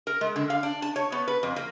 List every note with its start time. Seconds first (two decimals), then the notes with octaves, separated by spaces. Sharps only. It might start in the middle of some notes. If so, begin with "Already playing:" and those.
0.07 A#4
0.21 G#3
0.36 D3
0.50 F5
0.63 D4
0.82 A5
0.96 C#5
1.12 B3
1.28 B4
1.43 F2
1.56 A#3